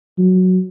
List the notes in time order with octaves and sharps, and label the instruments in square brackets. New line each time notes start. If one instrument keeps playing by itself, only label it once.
[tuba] F#3